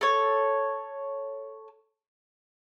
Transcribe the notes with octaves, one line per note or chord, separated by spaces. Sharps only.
A4 C#5